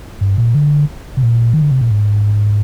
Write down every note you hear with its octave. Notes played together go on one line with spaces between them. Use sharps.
G2
A#2
D3
C3
A#2
D#3
D3
C3
A#2
G#2